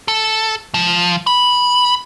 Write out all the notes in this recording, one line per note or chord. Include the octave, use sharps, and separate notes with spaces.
A4
F3
B5